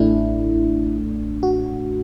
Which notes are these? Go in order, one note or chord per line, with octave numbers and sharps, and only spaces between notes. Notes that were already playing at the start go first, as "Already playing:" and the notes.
Already playing: A1 A2 A3 D4 E4
F#4